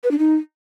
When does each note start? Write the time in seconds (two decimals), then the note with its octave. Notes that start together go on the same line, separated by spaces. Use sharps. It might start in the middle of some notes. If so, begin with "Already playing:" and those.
0.04 B4
0.11 D4
0.19 D#4